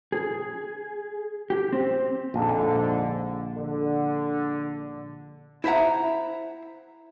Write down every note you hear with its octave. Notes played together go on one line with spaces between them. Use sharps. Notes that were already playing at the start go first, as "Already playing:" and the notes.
G#4
G4
C4
A#1 F2 G#2 D3
D3
E4 C5 E5 F#5 A#5